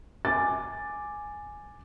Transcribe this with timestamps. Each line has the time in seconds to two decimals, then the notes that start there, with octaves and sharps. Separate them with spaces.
0.25 G#5 D6 A6